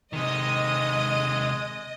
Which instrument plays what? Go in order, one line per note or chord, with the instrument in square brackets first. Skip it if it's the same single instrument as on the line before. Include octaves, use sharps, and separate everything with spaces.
[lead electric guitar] C3 D#3 [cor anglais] G#3 [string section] D#5